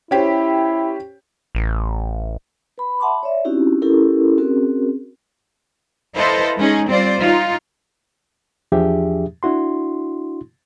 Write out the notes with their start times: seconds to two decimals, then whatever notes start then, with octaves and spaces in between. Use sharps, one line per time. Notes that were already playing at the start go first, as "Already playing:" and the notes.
0.11 C#4 E4 G4 C5
1.55 A1
2.78 B4 B5
3.00 E5 F#5 A5 B5 C6 D6
3.23 C#5 D5 E5
3.45 C4 C#4 D#4 E4 F#4 G4
3.82 C#4 E4 G4 A4 A#4
4.38 C4 C#4 F#4 G#4 A#4
6.15 E4 A4 B4 C5 D#5 F5
6.58 G#3 C#4 D#4 G#4
6.89 G3 C4 F4 C5 D5
7.22 D#4 F4
8.72 E2 F3 D4 G4 G#4 E5
9.43 D4 E4 F#4 C6